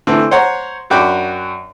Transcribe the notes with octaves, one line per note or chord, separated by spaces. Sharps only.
D3 E3 A3 C4
C5 C#5 F#5 A#5
F#2 D4 F#4 G5 B5 D6